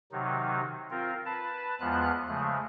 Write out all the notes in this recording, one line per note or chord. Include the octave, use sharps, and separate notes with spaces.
C3 D#3 F#3 D#4
C4 F4 A#4
B4 A5
E2 F3 G#3 B3 F4 F#6
C#3 F3 G#3 A3